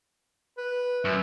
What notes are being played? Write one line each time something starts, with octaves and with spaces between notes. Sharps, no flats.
B4
F#2 E5